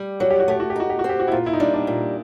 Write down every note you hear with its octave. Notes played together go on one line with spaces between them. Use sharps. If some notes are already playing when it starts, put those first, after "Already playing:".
Already playing: G3
F#3 F#4
G4
F#4
A3 G4
F#4
G4
D#4 F#4
G4
F#4
C4
G4
F#4
E4
A#2 F4
E4
D#4
G3 D4
D4
A#2